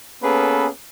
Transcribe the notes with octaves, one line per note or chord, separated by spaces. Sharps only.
A#3 B3 C#4 G#4 A4 B4